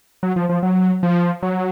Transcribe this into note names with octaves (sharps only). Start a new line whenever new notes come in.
F#3
F3
F3
F#3
F3
F#3